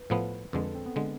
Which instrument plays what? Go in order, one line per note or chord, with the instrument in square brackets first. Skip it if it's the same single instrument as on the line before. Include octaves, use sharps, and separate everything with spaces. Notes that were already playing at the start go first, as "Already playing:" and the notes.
Already playing: [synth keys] B4
[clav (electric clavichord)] A2 F3 B3
[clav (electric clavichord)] F2 D3 G#3 [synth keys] B4
[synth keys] A4
C4
B3
[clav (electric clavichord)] D3 G#3